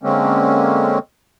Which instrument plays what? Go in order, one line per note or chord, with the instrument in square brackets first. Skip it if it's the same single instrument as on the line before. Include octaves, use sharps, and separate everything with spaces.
[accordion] D3 G#3 A#3 C4 C#4